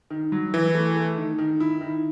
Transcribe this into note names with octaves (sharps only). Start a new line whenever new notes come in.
D#3
F#3
E3 E4
A3
A3
D#3
D#3
E4
D#3